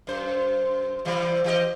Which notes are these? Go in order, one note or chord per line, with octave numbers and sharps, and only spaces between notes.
F#2 C5
C3 E3 G3
E3 G4 D#5